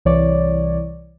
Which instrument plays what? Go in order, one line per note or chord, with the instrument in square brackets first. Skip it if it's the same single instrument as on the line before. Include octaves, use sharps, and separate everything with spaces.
[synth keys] C2 E3 C#5 D5